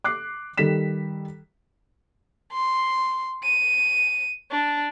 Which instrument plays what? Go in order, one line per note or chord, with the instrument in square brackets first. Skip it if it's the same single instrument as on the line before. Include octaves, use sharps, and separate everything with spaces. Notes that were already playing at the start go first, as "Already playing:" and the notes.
[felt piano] D6 F#6 C7
D#3 G3 A4 B6 E7
[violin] C6
D#7
D4